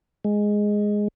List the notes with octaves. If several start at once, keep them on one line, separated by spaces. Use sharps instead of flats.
G#3